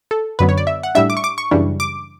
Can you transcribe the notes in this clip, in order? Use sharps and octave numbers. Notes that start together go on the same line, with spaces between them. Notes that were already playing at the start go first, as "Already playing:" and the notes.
A4
F#2 D3 F#3 B3 B4
C#5
D5
E5
F#5
A2 G3 D4 E5
D6
C#6
D6
C#6
F#2 C#3 E3 G3 D4
D6